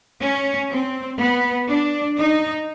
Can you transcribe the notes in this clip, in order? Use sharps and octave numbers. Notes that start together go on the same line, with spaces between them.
C#4
C4
B3
D4
D#4